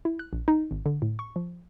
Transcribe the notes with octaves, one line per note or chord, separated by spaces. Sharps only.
E4
F#6
A#1
D#4
G#1
D3
A2
C#6
F3